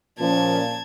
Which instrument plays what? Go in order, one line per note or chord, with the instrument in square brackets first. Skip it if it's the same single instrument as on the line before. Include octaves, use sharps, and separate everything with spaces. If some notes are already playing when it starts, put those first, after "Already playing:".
[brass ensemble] A#2 [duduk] F3 [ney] C#4 [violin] A5 G#6